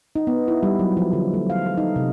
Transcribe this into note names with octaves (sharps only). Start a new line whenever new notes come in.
D#4
B3
E4
G3
F#3
F3
D3
A3
F5
A4
D#4
C3